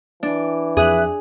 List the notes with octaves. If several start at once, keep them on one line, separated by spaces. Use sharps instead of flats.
E3 D4
F2 G#4 E5 F#6